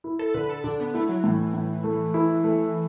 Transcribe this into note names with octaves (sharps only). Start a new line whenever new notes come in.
E4
A4
D3 B4
A4
D3 D4
B3
A3 E4
F#3
A2 E3
A2
A3
E4
A3